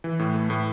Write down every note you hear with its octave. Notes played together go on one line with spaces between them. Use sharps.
E3
A2
A3
A2